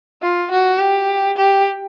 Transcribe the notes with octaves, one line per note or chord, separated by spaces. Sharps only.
F4
F#4
G4
G4